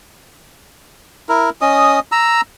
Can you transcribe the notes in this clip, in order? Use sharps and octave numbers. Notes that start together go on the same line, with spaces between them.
E4 A#4
C#4 D#5 D#6
A#5 E6